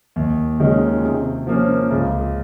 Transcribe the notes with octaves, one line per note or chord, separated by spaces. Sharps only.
D#2
D#3 G#3 C#4 F4
C3
F3 A#3 C#4
C#2